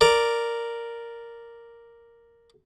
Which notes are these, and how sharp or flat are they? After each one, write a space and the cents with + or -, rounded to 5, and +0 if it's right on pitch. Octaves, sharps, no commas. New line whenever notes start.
A#4 +0 D5 +0